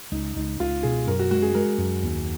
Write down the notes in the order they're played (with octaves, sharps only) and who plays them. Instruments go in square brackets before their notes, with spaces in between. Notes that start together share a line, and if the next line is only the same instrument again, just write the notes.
[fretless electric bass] C#2 [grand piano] D#4
[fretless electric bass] C#2 [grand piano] D#4
[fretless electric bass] C#2 [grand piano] F4
[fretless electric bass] B2 [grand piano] G#4
[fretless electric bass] F#2 [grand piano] A#4
[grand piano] F#4
[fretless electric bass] G#3 [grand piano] F#4
[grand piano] G#4
[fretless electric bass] G#3 [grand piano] A#4
[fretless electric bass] F#2
D#2